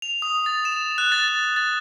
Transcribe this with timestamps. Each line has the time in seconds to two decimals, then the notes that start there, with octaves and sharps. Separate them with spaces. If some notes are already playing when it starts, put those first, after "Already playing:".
0.02 F7
0.22 D#6
0.46 A6
0.65 E7
0.98 F#6
1.12 A6
1.28 A6
1.56 A6